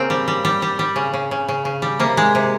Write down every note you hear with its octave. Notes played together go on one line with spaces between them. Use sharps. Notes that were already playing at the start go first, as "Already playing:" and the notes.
Already playing: C#3 A#3 C4
G3
G3
G3
G3
G3
C#3
C#3
C#3
C#3
C#3
G3
C3 A#3
G#3
C3